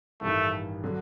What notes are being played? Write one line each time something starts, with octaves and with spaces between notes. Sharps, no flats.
A1 G2 D#3 A3
D3 F#3